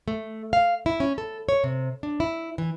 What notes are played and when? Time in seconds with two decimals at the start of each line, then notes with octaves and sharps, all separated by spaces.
0.08 A3
0.53 F5
0.86 E4
1.00 C#4
1.18 A4
1.49 C#5
1.64 C3
2.03 D4
2.20 E4
2.58 E3